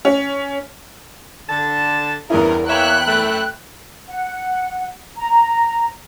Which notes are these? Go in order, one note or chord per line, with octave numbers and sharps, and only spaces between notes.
C#4
D3 A5
E2 G2 C#3 E4 A#4
A#3 C#5 E5 G5 B5 F#6
F#2 A3 E5
F#5
A#5